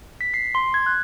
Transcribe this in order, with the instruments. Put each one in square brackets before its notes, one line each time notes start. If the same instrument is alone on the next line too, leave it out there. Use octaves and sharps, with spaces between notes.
[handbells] B6
C7
C6
G#6
F#6